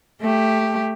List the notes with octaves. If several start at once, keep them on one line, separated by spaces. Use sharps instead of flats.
A3 G4